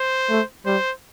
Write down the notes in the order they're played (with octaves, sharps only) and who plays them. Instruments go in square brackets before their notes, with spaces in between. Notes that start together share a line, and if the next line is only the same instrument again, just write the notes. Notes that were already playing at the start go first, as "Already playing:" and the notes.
Already playing: [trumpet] C5
[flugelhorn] A3
[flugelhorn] G3 [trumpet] C5